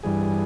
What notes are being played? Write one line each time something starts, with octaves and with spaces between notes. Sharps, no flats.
G2 E3 G3 G#4